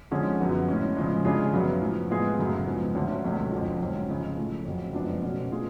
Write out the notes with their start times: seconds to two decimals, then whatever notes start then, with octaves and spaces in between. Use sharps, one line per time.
0.11 D3 F3 G#3 C#4 G#4
0.40 F#2 F3 B3 F#4
0.68 A2 G#3 C#4
0.97 C#3 F3 G#3
1.25 C#3 G#3 D4 F4 G#4
1.53 F#2 C#3 F#3 B3
1.82 A2 F3 B3
2.10 A2 G#3 B3 F4 G#4
2.38 F#2 C#3 F#3 A3
2.67 G#2 F3 B3
2.95 D2 D3 F#3 C#4
3.24 C#2 B2 F#3 A3 C#4
3.52 F2 D3 F3
3.80 G#2 F#3 C#4
4.09 C#2 C#3 F3 G#3
4.37 A2 F3 A3
4.65 F2 C#3 F#3
4.94 F#2 F3 G#3 B3 D4
5.23 B2 A3 C#4 F#4
5.50 B2 A3 F4 G#4